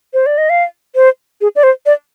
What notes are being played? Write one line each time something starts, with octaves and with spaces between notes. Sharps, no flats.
C5
D5
D#5
F5
C5
G#4
D5
C5
D5